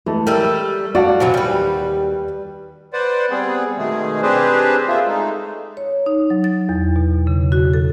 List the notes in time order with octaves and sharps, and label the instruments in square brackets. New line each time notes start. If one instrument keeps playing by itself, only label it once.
[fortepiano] E3 A3 [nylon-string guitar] G#3
[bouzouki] G3 A3 A4 [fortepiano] A#4
[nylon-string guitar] F#4 [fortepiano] D5 F5 A5
[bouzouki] C3 E3 F#3
[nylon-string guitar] D#2 [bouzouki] G3 B4
[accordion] B4 C5 D5 F#5
G3 B3 C4 G#4
B2 D#3 G#3 A3 G#4
C4 D4 G4 G#4 B4 C5
A#3 F4 G#4 E5
G#3 A3 D#4
[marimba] C#5
D#4
F#3
A6
E2
B2
C#3
F#4
A4